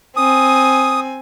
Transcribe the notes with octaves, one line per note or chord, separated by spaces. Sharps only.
C4 G#5 D#6